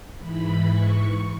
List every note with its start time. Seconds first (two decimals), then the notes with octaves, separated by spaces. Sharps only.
0.18 G#2 E3 B5
0.70 C#6